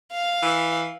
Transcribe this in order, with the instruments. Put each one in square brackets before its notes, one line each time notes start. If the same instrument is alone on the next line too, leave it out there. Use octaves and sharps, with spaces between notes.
[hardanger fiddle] F5
[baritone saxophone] E3